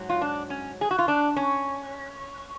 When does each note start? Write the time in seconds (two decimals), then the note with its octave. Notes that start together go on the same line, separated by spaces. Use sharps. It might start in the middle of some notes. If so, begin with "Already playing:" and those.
Already playing: G#2 F#3
0.09 F4
0.21 D4
0.50 C#4
0.81 G#4
0.91 F#4
0.99 F4
1.08 D4
1.36 C#4